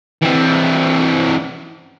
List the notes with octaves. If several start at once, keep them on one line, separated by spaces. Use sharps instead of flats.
E3 C4